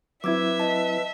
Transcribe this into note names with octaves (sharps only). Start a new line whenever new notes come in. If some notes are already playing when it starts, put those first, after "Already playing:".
F#3 C4 E4 B4 E5 D6 E6 G#6
D#5 A5